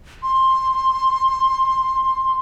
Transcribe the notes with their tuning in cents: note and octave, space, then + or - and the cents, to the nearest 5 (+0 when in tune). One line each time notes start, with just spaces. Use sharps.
C6 +10